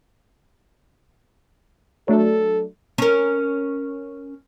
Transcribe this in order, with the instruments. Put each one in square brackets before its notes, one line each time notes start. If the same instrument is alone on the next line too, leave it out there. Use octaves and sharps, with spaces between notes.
[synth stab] F#3 A3 D4 [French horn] A4
[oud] C#4 A#4